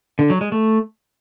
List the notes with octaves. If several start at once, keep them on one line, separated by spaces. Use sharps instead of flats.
D3
F#3
G#3
A3